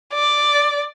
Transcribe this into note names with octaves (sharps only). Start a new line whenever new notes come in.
D5